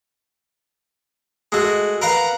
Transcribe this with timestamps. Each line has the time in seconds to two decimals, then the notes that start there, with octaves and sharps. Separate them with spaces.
1.52 G#3 A3 F#4
2.02 A#4 B4 F5 F#5 A#5